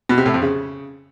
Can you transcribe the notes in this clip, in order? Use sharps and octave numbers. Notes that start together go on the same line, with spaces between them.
B2
C3
A2
F2
C#3